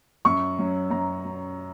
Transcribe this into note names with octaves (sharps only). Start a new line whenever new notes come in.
F#2 C#6
F#3 C#4
F#2 A#5
F#3 C#4